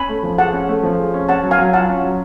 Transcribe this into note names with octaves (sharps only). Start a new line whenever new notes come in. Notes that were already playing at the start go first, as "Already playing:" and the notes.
Already playing: C#4 G#5 B5
A3
F3
G#4 F#5 A5
C#4
A3
F3
G#4
C#4
C#4 F#5 A5
F#3
F5 G#5
F#3
F4 F#5 A5
C#4
F#3